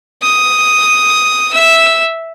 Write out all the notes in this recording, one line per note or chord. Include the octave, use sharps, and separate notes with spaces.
D#6
E5 E6